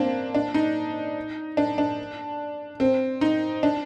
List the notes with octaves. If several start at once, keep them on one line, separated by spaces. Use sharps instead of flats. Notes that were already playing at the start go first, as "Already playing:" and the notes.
Already playing: A#3 C4 D4
D4
D#4
D4
D4
C4
D#4
D4